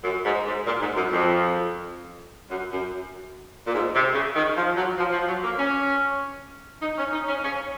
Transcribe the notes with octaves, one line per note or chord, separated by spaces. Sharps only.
F#2
G#2
G#2
A#2
G#2
F#2
F2
F#2
F#2
A#2
G#2
C3
C#3
D#3
F3
F#3
F3
F3
F#3
A#3
C#4
D#4
C#4
D#4
C#4
C#4